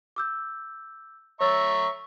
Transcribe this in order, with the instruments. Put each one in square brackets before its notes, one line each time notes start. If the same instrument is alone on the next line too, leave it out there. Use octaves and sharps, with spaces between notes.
[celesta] D6 E6 G6
[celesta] C#5 E6 A6 [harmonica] E5 A#5 C#6